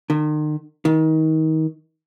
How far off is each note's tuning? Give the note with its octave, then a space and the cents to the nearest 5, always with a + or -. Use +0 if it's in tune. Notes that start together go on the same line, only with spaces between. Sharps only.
D#3 -40
D#3 +30